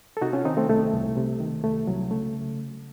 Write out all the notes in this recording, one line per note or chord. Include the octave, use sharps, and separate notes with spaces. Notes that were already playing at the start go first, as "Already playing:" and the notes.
A4
C3 D#4 F#4
C#4 F4
D#3 C4 D#4
A3 C4
C2 A3
C2
C3
D#3
C2 A3
C2 F#3
C#3 A3